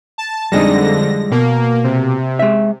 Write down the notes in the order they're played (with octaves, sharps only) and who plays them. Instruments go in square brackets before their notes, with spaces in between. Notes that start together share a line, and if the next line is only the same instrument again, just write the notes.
[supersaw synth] A5
[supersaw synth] F2 D3 A#6 [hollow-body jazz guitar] G3 G#3 D#4
[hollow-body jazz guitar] B2 [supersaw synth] A#3
[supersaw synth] C3
[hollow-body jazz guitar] G#3 E5